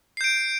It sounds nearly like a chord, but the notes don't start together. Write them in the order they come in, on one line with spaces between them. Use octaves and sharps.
C7 G6 D7